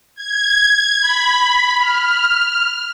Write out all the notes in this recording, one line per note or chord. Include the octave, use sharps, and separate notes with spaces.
G#6
B5
F6